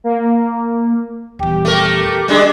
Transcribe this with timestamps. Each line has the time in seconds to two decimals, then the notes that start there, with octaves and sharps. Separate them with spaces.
0.04 A#3
1.39 D#1 E2 G4
1.65 A3 A#4
2.28 G3 G#3 A#3 D4